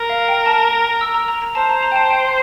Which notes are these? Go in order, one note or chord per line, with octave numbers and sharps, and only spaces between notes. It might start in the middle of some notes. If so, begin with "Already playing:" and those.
Already playing: A#4
F5
G5
A5
E6
A#5
A#5
A#5
C5 A5
A#5
A#5
G5
A5
G5